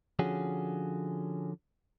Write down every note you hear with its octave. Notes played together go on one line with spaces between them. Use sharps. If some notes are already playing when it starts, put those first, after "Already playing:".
D3 F3 C#4 F#4 G#4